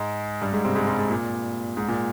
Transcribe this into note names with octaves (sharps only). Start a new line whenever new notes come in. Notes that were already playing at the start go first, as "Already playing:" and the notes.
Already playing: G#2 G#3
G2 G3
G#2 G#3
C3 C4
G#2 G#3
G2 G3
G#2
A#2
G#2
A#2